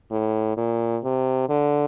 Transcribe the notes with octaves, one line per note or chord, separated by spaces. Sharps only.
A2
A#2
C3
D3